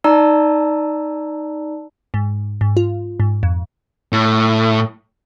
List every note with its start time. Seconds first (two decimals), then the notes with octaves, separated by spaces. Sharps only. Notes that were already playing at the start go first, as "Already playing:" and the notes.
0.04 D#4 D5 A5 A#5 E6
2.14 G#2
2.61 G#2
2.77 F4
3.20 G#2
3.43 F2
4.12 A2